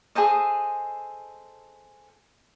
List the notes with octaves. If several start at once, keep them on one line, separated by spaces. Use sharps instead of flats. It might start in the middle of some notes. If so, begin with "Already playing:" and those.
G#4 A4 C5 D#5